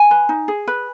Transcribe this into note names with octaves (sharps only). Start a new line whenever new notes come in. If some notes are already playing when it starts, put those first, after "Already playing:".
Already playing: G#5
B4
D#4
G#4
B4